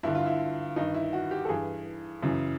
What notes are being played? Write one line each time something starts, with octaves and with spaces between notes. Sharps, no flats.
G2 D3 E4
F4
E4
G2 D#3 D#4
E4
F#4
G4
A4
G2 E3 G#4
F#2 C#3 E3